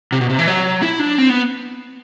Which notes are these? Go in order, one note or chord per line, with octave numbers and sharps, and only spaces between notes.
C3
B2
C3
E3
F#3
E4
D4
C4
B3